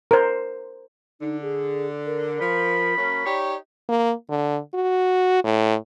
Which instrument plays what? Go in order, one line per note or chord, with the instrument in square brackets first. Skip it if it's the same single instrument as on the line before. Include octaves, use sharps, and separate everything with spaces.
[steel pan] A#4 C5
[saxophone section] D3 [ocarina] D#4
[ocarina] G#4
A#4
[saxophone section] F3 [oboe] B5
[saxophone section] F#3 A#3 C#4
[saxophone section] D#4 G4 C#5 [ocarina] D5
[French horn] A#3
D3
F#4
A2